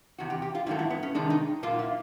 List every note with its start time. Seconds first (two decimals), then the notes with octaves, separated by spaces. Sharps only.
0.18 E2 C3 F#4
0.30 G4
0.42 G4
0.55 F4
0.66 G#2 D#3 F#3 A3 E4
0.79 E4
0.90 B3
1.03 C#4
1.15 C3 D#3 G#3 D4
1.30 D#4
1.63 A#2 F#3 A#3 F4
1.79 E4